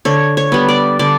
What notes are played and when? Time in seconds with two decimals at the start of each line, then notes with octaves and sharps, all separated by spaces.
0.05 D3 C#5
0.37 C#5
0.52 G3 B3
0.68 D5
0.99 D3 D5